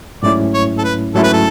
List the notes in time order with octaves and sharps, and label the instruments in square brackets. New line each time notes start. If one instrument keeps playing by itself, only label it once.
[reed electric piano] G#2 F#3 A3 C#4 E4 [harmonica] D5
[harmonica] C#5
A4
B4
[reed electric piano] G#2 F#3 A3 C#4 E4 [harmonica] A4
[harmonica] B4
A4